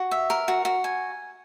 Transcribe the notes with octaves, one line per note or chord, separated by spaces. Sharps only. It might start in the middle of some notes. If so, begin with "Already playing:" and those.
Already playing: F#4
E5
A#4
F#4
F#4
G#5